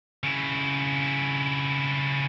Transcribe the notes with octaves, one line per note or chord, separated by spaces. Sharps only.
C#3 E4